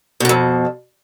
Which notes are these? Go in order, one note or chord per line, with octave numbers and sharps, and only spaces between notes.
F2 G#2 B2